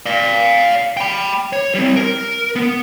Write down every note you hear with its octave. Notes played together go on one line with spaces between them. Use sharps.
D5 F5
G5 B5
C#5
G3 C4
A#4
B3